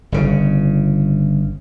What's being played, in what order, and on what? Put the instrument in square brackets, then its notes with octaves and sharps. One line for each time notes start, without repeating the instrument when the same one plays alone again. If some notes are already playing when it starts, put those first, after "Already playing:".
[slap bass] G1 C#3